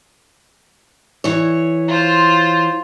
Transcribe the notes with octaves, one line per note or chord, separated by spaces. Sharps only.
E3 C#5
F4 C5